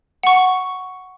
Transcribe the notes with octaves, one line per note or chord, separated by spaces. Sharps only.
F#5 C#6